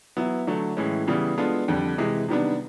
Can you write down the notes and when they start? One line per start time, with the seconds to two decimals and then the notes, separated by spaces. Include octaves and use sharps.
0.17 F#3 B3 E4
0.47 D3 F#3 A3
0.77 A2 E3 G#3 C#4
1.07 C#3 E3 G3 B3
1.38 G#3 B3 D4 F4 A4
1.68 F2 D3 G3
1.98 C3 E3 G#3
2.28 C3 D#3 G3 B3 D4